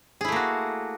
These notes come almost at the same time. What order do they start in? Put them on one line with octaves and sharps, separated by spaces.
G#4 E4 A3 A#3 F#4